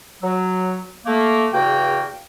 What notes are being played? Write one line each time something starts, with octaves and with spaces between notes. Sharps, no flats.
F#3
A3 A#3
E2 G2 C#3 A#3 F#4 G5